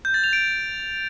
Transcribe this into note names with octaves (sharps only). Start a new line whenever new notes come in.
G6
A6
F7
D7